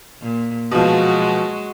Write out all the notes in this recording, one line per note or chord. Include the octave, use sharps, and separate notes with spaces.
A#2
B2 F3 F#3 G#3 F#4